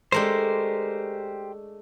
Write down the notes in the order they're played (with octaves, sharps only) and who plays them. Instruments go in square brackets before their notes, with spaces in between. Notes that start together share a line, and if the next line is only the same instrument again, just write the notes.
[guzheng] G#3 A3 D4 [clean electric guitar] G4 A#4 C5